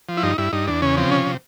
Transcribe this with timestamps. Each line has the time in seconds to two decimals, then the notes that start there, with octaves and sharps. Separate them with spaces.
0.09 F3
0.17 E4
0.23 G2 D#4
0.38 G2 E4
0.53 G2 D#4
0.67 E2 D4
0.82 C#3 C#4
0.97 F3 C4
1.12 C3 C#4
1.27 C3